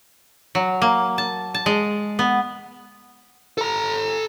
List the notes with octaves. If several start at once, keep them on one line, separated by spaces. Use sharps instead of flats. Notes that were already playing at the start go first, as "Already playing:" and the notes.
F#3
A#3
A5
A5
G#3
B3
A4 A#5